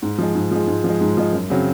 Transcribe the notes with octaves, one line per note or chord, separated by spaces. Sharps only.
G#2
F3 G#3
G#2
F3 G#3
G#2
F3
G#3
G#2
F3 G#3
F#2
C#3 F#3 C4